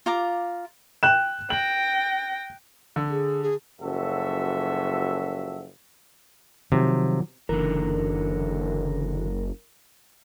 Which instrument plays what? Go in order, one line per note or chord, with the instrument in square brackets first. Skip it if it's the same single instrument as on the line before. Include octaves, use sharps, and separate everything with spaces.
[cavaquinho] F4 A#5 D6
[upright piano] G5 F#6 E7
[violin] G5 A#6 [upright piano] F#7
[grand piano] D3
[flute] G#4
[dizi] G#4
[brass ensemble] F#1 F#2 F3 F#4 A4 E5
[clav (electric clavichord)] C3 [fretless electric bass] D#3 F3 F#3
[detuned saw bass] F#1 [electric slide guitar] D3 E3 [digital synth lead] A#4